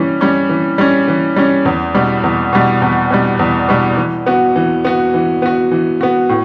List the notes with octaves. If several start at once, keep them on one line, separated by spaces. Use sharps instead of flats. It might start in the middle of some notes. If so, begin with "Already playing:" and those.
Already playing: E3 G3 C#4
G3 C#4
E3
G3 C#4
E3
G3 C#4
E2
B2 G3
E2
B2 G3
E2
B2 G3
E2
B2 G3
E3
B3 F#4
E3
B3 F#4
E3
B3 F#4
E3
B3 F#4
A2